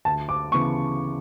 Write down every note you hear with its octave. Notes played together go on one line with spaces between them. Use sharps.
D2 A5
D6
C#3 E3 B3 C#6